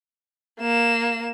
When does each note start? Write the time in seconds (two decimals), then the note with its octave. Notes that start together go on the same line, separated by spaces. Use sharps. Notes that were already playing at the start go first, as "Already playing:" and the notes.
0.60 A#3 E7